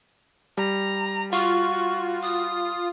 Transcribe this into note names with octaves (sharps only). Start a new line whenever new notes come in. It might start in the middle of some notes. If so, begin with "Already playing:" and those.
G3 A#5
F4 F#4 C#6
D#6